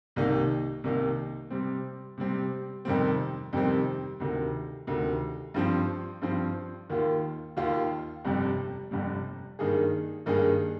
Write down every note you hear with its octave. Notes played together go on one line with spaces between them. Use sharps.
C2 C3 D#3 A#3 D#4
C2 C3 D#3 A#3 D#4
C3 G3 C4
C3 G3 C4
F2 C3 D#3 G3 C4
F2 C3 D#3 G3 C4
D2 C3 D#3
D2 C3 D#3
G2 F3 C4
G2 F3 C4
D#2 D#3 A#3 F4
D#2 D#3 A#3 F4
G1 F2 C3 G3
G1 F2 C3 G3
G2 D#3 A#3 D#4 G#4
G2 D#3 A#3 D#4 G#4